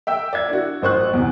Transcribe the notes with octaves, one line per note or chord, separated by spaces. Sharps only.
E5 G5 E6
D5 E5 G#6
D4 E4 F#4
A1 C5 C#6 F#6
E2 C3